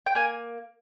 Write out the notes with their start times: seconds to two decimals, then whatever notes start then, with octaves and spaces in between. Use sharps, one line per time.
0.06 G5
0.15 A#3 G#5